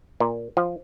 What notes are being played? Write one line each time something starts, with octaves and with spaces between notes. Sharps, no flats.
A#2
F3